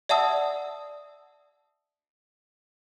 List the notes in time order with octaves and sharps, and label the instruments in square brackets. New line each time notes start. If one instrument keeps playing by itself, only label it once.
[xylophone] D5 E5 F#5 A5 D#6 E6